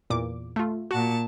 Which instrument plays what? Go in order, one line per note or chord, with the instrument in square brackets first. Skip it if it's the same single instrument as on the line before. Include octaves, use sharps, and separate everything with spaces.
[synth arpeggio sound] E2 A#2 D6
A3 F4
[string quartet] A#2 A5 [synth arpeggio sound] F#4